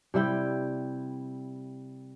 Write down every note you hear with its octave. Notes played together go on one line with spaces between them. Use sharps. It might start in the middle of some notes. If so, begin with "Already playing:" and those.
C3 G3 E4 G5